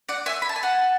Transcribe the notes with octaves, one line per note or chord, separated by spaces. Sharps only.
D5 F#5
E5 G#5
B5
A5
G#5
F#5 A5